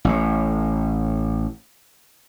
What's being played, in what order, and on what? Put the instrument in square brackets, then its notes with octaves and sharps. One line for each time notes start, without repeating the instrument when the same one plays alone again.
[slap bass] A1 A2